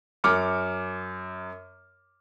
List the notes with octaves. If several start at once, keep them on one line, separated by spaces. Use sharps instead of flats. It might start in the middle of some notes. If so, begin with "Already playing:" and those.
F#2 D6 F6 C#7